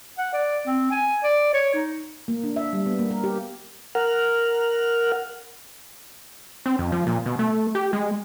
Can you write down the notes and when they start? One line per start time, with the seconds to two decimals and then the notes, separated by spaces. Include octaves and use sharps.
0.18 F#5
0.33 D5
0.67 C4
0.91 G#5
1.24 D5
1.53 C#5
1.74 D#4
2.28 A#3
2.44 D4
2.56 E5
2.73 G3
2.86 B3
2.99 A#3
3.11 A#4
3.24 G4
3.95 A#4 F#5 F6
6.66 C4
6.79 F2
6.92 F3
7.07 A#2
7.26 B2
7.39 A3
7.75 G4
7.93 G#3